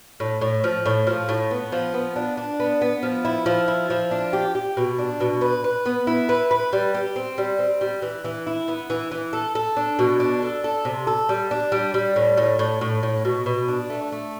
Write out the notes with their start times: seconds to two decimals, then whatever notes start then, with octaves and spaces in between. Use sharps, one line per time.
0.20 A2
0.41 A2
0.64 F3
0.86 A2
1.07 F3
1.29 A2
1.51 B3
1.72 F3
1.94 B3
2.16 D4
2.37 D4
2.60 B3
2.82 B3
3.03 F3
3.25 E4
3.46 F3
3.68 E4
3.90 F3
4.11 D4
4.33 G4
4.55 G4
4.77 B2
4.98 D4
5.20 B2
5.41 B4
5.64 B4
5.86 B3
6.07 E4
6.29 B4
6.51 B4
6.73 G3
6.94 G4
7.16 C4
7.38 G3
7.59 C4
7.81 G3
8.02 E3
8.24 E3
8.47 E4
8.68 B3
8.90 E3
9.11 E3
9.33 A4
9.55 A4
9.77 D4
9.99 B2
10.20 D4
10.42 A4
10.64 A4
10.85 C3
11.07 A4
11.29 G3
11.51 D4
11.72 G3
11.94 G3
12.16 A2
12.37 A2
12.59 A2
12.81 A2
13.03 A2
13.25 B2
13.46 B2
13.68 D4
13.90 A3
14.12 A3